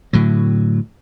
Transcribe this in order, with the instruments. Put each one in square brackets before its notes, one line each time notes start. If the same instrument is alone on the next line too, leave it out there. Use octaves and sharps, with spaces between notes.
[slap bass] A2 D3 F#3